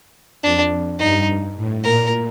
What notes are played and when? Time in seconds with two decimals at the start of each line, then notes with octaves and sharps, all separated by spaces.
0.43 F2 D4
0.99 G2 D#4
1.56 A2
1.84 A#2 A#4